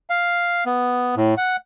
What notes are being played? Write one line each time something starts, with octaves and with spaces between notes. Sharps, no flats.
F5
B3
A2
F#5